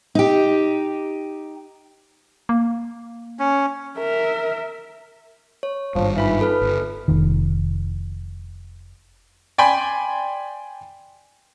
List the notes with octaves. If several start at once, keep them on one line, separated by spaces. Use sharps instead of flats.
D#4 G4
A#3
C#4
A#4 E5
C#5
G#1 G2 F3
E3 D#4 F4 B5
A4 B4 F6
G1
F1 D#3
D5 G5 G#5 B5 C6